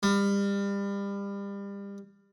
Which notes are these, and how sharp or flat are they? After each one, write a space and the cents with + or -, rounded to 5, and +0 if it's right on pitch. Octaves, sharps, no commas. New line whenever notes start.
G3 +30